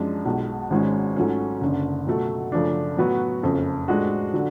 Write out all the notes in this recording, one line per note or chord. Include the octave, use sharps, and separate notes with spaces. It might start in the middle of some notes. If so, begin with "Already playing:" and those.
Already playing: F#2 F3 G#3 D4
B1 B2 G#3
G#1 G#2 G#3 C#4 F#4
G#2 F#3 A3 C#4
F#1 F#2 D3
B2 F#3 A3
F#2 C#3 F3 A3 D4
A2 F#3 B3 F#4
F#1 F2 C#3
A2 G#3 D4 F#4
D3 F#3